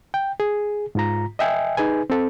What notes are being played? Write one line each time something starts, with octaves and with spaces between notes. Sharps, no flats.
G5
G#4
G#2 F4 A#5
D#5 E5 G5 G#5
D#4 G#4 B4 G#5
C4 A4